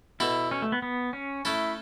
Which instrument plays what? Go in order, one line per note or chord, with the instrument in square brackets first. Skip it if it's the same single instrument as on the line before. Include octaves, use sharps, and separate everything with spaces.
[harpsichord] B2 B3 A4 [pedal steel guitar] E4
[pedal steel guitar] C#4
A3
B3
B3
C#4
[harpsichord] A3 C#4 A4 [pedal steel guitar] E4